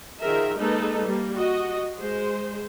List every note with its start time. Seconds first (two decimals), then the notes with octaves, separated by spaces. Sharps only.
0.20 D#3 F3 G#4 A#4 E5
0.58 G#3 A#3 D#4 A4 B4
1.03 G3 A#3
1.35 F#4 D#5
1.99 G#3 C5